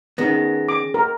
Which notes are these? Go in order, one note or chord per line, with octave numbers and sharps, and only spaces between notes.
D#3 B3 C#4 G#4 A#6
D6
A#4